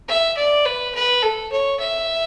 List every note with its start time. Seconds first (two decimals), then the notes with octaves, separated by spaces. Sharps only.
0.08 E5
0.37 D5
0.66 B4
0.94 B4
1.23 A4
1.52 C#5
1.80 E5